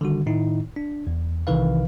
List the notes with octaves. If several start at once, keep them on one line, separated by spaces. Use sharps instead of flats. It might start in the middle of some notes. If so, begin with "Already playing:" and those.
D3 D#3 G3 F#4
A2 D#3 D#4 E4
D4
E2
B1 C3 D#3 E3 B4 F5